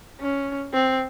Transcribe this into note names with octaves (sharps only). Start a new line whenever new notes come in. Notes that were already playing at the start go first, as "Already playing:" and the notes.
C#4
C4